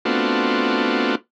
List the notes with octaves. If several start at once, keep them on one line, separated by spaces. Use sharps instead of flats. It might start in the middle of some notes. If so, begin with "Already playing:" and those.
A3 B3 C4 D4 F4 F#4